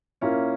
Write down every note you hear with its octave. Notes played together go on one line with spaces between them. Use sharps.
A#2 A#3 C#4 E4